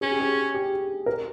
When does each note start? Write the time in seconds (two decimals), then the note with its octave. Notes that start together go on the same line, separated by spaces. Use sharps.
0.01 C#4 G#4
0.11 G4
0.20 G#4
0.54 G4
1.06 A#4